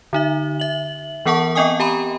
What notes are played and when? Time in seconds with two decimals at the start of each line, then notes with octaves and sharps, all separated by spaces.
0.13 D3 D#4 E5
0.60 E5 F#7
1.25 E3 B3 A#4 F#5 A5 C#6
1.55 B3 C4 D#5 G5 G#5 D#6
1.80 G4 G#5 A#5 B5